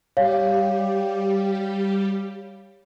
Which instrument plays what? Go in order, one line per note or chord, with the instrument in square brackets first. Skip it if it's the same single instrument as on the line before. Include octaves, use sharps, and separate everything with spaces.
[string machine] G3 G4 [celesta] C#5 F5